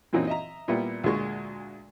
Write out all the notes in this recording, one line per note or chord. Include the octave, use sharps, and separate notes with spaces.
F#2 A#2 E3 F#3 C4 D#4
D#5 E5 A#5
A#2 G3 B3 E4
D2 A#2 G#3 C#6